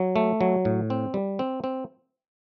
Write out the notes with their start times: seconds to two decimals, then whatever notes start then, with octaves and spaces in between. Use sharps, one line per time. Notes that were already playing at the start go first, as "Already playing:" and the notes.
Already playing: F#3
0.16 A3
0.41 F#3
0.65 A2
0.90 C4
1.14 G3
1.39 C4
1.64 C4